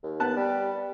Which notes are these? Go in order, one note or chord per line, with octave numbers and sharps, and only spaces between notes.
D#2
B3 A5 F#6
G3